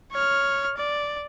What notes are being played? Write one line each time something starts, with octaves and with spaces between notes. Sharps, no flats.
C#5 F6
D5